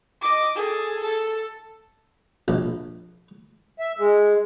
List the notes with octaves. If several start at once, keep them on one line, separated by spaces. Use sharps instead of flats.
D#5 D6
G#4 A4
A4
A#1
E5
G#3